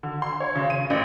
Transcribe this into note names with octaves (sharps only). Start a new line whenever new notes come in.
D3
C6
C#5
C#3
D#7
A1